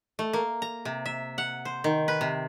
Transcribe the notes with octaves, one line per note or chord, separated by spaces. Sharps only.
A3
A#3
A#5
C3
E5
F#5
C5
D#3
B4
C3